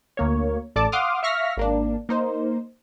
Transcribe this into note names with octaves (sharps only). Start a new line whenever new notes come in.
D2 A#3 C#5
A1 A4 D5 A5 D6
F5 F#5 C6 D6 D#6 F6
E5 F5 C#6 F6 A#6 B6
G#1 A#3 D4
A#3 D#4 C5